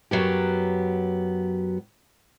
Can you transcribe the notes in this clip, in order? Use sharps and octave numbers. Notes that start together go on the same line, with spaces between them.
F#2 F#3 B3 G4